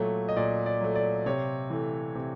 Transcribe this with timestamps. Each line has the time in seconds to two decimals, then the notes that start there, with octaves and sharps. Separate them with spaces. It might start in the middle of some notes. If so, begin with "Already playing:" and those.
Already playing: A#2 F#3 A3
0.29 D#5
0.36 A#2 D5
0.66 D5
0.81 F#3 A3
0.96 D5
1.26 C3 C#5
1.70 E3 A3
2.15 C3